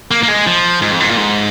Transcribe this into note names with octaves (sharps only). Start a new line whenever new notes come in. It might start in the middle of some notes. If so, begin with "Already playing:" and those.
A#3
A#3
G#3
F3
G#2
F2
G#2
A#2
G#2